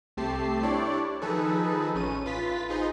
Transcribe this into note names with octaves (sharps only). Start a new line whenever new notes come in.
C2 A3 C4 G4 A5 C7
D4 E4 G4 C#5 D5
D#3 F3 D#4 G#4 A4 B4
A1 C#4 D#7
A1 F4 B4 A6 B6
D#4 F4 G#4 C5 D#5